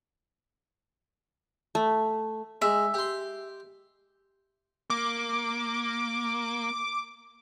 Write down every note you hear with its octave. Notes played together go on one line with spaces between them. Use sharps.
A3
G#3 E5
G4 C6
A#3 D6